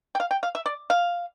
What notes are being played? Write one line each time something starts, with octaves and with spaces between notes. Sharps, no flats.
G5
F5
G5
F5
E5
D5
F5